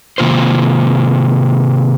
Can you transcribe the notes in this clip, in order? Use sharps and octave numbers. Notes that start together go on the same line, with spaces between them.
C3 D#3 A#3 F4 C5